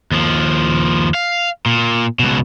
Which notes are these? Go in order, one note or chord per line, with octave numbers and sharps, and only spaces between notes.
D#2 F3
F5
A#2
C#2 B2